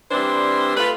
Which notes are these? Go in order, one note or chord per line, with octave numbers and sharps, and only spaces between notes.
E3 G3 C4 D4 C5
A3 F4 B4